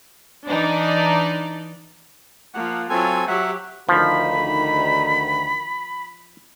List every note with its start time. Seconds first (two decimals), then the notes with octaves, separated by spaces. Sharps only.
0.48 E3 D4 D#4 D5
2.54 F3 A#3 F#5
2.90 F#3 C4 F4 A4 G#5
3.28 F#3 G4 E5 F#5
3.89 D2 D#3 F3 B5